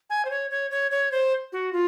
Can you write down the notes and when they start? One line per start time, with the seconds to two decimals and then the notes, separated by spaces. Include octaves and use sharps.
0.10 G#5
0.25 C5
0.30 C#5
0.51 C#5
0.71 C#5
0.91 C#5
1.12 C5
1.52 F#4
1.73 F4